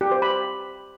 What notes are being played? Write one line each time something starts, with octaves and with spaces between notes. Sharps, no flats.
G4
C5
B5